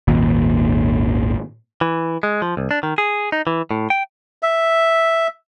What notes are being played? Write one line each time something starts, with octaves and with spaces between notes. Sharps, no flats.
G#1 D#2 A#2
E3
G#3
F3
C2
D4
D#3
G#4
D#4
E3
A2
G5
E5